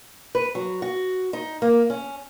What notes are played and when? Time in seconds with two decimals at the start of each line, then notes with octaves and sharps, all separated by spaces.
0.35 B4
0.55 F#3
0.82 F#4
1.33 D#4
1.62 A#3
1.90 C#4